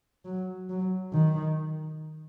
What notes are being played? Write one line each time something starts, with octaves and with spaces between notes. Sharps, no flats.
F#3
F#3
D#3